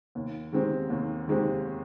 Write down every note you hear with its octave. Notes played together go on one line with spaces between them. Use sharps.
D#2
D#3 G#3 C4 G4
D#2
D#3 G#3 C4 G4